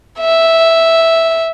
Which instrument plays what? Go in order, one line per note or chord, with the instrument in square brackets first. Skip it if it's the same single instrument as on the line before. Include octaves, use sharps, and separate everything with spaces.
[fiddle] E5